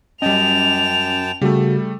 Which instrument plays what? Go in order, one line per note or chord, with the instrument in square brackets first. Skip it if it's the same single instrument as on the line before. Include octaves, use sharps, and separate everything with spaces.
[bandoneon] F#2 G5 A5 [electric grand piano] G3 D#5 [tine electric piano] C#4 [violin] F7
[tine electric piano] C#3 F#4 [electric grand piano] G3 A3